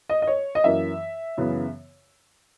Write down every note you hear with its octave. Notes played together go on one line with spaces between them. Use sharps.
D#5
D#5
C#5
D#5
F#2 E3 A#3 E5
F#2 C#3 E3 B3